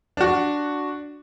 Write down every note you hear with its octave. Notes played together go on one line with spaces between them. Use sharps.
D4 F#4